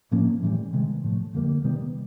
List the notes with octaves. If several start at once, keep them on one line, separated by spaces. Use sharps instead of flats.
A2 F3 A#3 C#4
A2 E3 G3
C3 D#3 G#3
A2 F3 A3
F2 D3 G3 A#3
C3 D#3 G3 B3